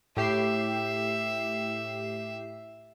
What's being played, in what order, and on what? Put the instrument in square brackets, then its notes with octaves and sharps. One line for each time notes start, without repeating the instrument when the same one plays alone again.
[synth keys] A2 G4 C7 [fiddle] E5